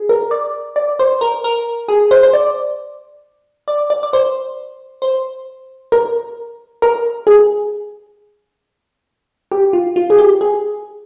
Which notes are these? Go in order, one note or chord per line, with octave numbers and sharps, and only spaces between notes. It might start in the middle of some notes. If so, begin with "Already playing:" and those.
Already playing: G#4
A#4
D5
D5
C5
A#4
A#4
G#4
C5
C5
D5
D5
D5
D5
C5
C5
A#4
A#4
G#4
G4
F4
F4
G#4
G4
G#4